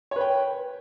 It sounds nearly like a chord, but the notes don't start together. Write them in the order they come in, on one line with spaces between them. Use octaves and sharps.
C#5 B4 G5